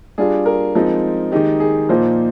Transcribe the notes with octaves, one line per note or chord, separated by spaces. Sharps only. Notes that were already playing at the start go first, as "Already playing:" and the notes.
G3 D4 F4 G#4
A#4
F3 G#3 C4 D#4
D#3 G#3 D#4 G4
G#4
A#2 F3 A#3 D#4 C5